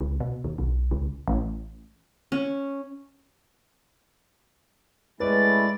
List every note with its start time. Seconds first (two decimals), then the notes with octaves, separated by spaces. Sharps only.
0.01 C#2
0.20 B2
0.44 D#2
0.58 B1
0.91 C#2
1.28 A1
2.32 C#4
5.20 A2 G#3 C#4 E4 B4 D5 A6